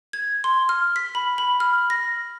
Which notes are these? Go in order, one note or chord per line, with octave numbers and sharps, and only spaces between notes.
G#6
C6
F6
B6
B5
B5
F6
A#6